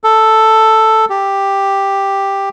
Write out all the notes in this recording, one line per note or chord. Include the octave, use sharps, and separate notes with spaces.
A4
G4